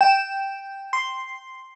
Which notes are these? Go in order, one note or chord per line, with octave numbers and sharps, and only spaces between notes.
G5 E7
C6